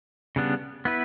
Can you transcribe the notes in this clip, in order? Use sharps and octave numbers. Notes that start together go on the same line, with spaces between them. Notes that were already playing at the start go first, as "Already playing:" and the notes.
C#3 G3 B3 D4
B3 E4 B4